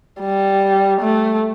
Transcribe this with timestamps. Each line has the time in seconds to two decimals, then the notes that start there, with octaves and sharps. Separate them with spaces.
0.20 G3
1.01 A3